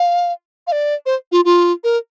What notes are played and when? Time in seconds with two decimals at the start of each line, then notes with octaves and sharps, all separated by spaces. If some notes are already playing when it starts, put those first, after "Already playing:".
Already playing: F5
0.67 F5
0.72 D5
1.06 C5
1.32 F4
1.45 F4
1.84 A#4